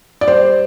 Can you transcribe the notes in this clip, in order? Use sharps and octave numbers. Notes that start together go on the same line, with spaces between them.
D5
G3 C5